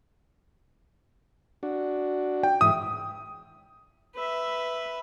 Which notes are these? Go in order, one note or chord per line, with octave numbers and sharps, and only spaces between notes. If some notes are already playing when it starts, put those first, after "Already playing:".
D4 F#4
G5
G#2 E3 E5 D#6
B4 E5